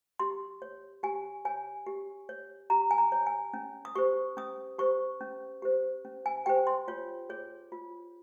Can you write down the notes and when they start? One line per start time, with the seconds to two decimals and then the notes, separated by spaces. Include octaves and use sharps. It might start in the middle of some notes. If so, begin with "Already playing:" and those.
0.19 G4 C6
0.62 C#5
1.03 G4 G#5
1.45 C#5 G#5
1.86 G4
2.29 C#5
2.70 G4 A#5
2.91 G#5
2.98 A#5
3.12 C#5
3.26 G#5
3.54 C#4
3.85 D#6
3.95 G4 C5 C#6
4.37 C#4 D#6
4.78 G4 C5 C#6
5.21 C#4
5.62 G4 C5
6.05 C#4
6.26 G#5
6.46 G4 C5 G5
6.67 C6
6.88 F4 C#5
7.29 G#4 C#5
7.72 F4